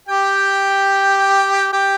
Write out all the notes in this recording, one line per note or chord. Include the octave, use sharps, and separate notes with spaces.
G4 G5
G4 G5